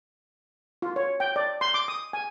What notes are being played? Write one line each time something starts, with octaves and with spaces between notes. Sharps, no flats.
F4
C#5
G5
D5
C6
D6
D#6
G#5